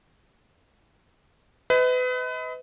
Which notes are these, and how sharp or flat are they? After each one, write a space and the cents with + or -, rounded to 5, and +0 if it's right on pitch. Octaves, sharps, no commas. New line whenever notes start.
B4 +30 D#5 +35